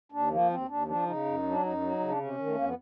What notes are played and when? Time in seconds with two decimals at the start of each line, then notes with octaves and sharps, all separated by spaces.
0.12 D#2 D4
0.31 F3 A#3
0.50 D#2 C4
0.68 D#2 D4
0.87 F3 D4
1.06 C#3 D#4
1.25 F#2
1.43 F#3
1.50 D4
1.62 F#2 D#4
1.81 F#3
2.00 C#3
2.09 D4
2.18 C3 C#4
2.38 D#3
2.46 A3
2.55 F2 A#3
2.65 B3